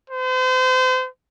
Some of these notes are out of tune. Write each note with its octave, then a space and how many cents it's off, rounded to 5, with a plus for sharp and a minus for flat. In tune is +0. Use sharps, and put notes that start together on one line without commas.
C5 -35